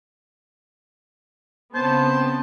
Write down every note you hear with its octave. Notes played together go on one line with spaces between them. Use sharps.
C#3 B3 C4 C5 A5